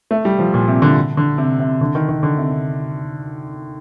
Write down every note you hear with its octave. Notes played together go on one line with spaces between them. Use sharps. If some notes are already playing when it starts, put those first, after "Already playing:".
A3
G3
F3
A#2
C3
D3
D3
C3
C3
D3
D#3
D#3
D3
C3
C3